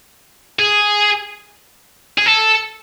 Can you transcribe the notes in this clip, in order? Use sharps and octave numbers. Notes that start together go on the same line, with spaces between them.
G#4
G#4
A4